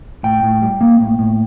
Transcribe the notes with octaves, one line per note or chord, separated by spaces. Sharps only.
A2 G5
A2
G3
A#3
A2
A2